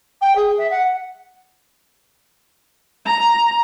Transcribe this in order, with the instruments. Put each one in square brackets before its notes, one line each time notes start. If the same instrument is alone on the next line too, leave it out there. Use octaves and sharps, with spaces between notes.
[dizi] G5
G#4
E5
F#5
[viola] A#5